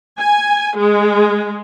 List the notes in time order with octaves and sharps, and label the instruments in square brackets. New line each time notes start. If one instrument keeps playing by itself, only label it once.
[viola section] G#5
G#3